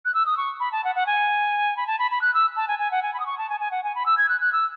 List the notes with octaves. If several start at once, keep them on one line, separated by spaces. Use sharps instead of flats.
F#6
E6
D#6
C#6
B5
A5
F#5
F#5
G#5
B5
A5
B5
B5
F#6
E6
A5
G#5
G#5
F#5
G#5
B5
D#6
C#6
A5
G#5
G#5
F#5
G#5
B5
E6
G#6
F#6
F#6
E6